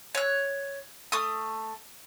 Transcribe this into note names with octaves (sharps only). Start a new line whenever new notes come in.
C#5 F#6
A3 D#6